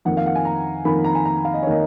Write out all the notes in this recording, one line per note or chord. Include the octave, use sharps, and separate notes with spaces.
F2 D#3 A#3 F#5
F5
F#5
G#5
A#5
F2 D#3 A#3 B5
A#5
G#5
A#5
F5
D#5
C#5
D#3 A#3 D#5